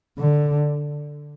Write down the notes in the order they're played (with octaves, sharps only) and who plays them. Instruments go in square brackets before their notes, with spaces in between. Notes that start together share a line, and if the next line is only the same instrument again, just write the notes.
[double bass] D3